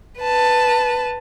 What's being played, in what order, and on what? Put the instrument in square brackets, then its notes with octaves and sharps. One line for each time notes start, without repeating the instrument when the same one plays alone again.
[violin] B4 A5